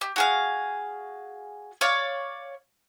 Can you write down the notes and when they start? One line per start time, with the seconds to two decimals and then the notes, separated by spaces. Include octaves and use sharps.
0.01 G4
0.16 F#4 G#4 F5
1.81 C#5 D5 F5